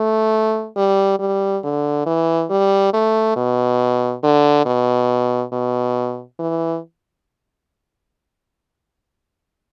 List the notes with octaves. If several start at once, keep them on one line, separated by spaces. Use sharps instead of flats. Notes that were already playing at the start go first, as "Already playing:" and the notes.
Already playing: A3
G3
G3
D3
E3
G3
A3
B2
D3
B2
B2
E3